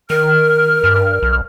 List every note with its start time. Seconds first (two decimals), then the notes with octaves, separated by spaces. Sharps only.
0.10 D#3 A#4 F6
0.84 G2
1.22 B1